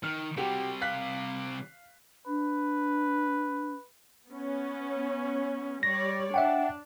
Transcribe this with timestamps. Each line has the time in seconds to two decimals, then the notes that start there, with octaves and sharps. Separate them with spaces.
0.04 D#3 F6
0.37 C3 G3 F#4 G4
0.81 F5 F#6 B6
2.27 D4 B4
4.29 B3 C#4
5.83 G3 C#5 D5 A#6
6.34 D4 E5 F#5 G5